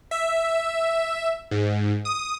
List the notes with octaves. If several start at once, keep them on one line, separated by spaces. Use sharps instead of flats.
E5
G#2
D#6